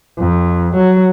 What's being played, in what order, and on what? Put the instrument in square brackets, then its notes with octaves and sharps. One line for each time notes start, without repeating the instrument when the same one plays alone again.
[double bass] F2
F#3